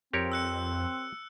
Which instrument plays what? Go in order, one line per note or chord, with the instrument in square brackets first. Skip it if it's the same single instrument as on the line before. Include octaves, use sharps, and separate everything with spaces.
[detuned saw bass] F2 [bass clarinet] C4 [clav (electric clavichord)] G4 A#4 C#5
[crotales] E6 F#6 C#7